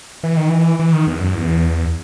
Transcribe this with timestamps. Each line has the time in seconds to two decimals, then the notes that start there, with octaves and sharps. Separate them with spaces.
0.23 E3
0.37 D#3
0.50 E3
0.79 E3
0.93 D#3
1.07 E2
1.20 F#2
1.34 E2